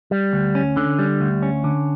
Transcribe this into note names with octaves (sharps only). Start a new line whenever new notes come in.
G3
D2
C#4
D3
G3
D2
C#4
D3